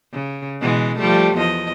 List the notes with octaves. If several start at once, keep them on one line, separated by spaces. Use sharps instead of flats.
C#3
B2 E3 G#3
F3 G3 A3
E2 F3 D#5